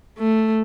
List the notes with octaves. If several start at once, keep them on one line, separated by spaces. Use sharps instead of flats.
A3